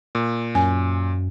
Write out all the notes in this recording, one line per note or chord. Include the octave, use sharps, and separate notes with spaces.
A#2
F#2 G#5